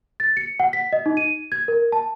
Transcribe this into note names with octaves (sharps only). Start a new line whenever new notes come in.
A6
C#7
F#5
B6
D#5
D#4
D#7
G#6
A#4
A5